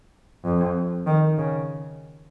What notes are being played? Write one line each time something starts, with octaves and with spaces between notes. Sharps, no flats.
F2
D#3
C#3